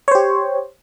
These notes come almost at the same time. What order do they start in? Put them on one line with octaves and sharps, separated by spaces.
C#5 C5 G4